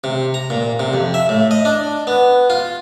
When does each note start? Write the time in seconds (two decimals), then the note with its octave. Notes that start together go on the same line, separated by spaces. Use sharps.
0.04 C3
0.34 A#5
0.50 A#2
0.80 C3
0.94 F2
1.14 E5
1.29 A2
1.51 D#5
1.65 D4
2.07 B3
2.50 F4